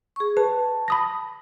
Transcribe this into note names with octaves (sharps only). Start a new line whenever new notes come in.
G#4 C#6
B4 A5
B5 D#6 A#6